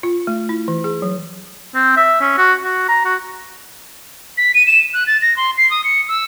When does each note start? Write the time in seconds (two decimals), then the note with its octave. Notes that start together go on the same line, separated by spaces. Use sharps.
0.03 F4
0.27 A3
0.49 E4
0.68 E3
0.84 G#4
1.02 F#3
1.75 C4
1.97 E5
2.21 C#4
2.38 F#4
2.63 F#4
2.88 A#5
3.05 F#4
4.37 B6
4.54 D#7
4.67 E7
4.93 F#6
5.06 A6
5.21 A#6
5.36 C6
5.57 C7
5.70 D#6
5.84 C#7
6.08 E6